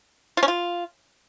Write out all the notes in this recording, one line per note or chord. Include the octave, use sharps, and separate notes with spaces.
F4
C#4
F4